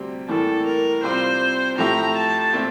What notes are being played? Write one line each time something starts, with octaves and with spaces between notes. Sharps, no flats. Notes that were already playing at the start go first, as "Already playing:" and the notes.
Already playing: D2 C3 G3 C4 G4
A2 E3 G3 A#3 A4
A#4
C3 G3 C4 F4 C5
A2 F3 A3 E4 G4 A#5
A5
A#2 A3 C4